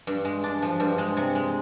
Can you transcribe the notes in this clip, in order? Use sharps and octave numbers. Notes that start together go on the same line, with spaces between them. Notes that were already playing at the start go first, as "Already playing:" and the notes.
G2
G#3
D4
F3
G2
G#3
C3
G#3